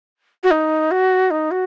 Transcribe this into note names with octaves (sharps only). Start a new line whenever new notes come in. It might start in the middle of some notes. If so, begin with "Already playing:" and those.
F#4
D#4
F#4
D#4
F#4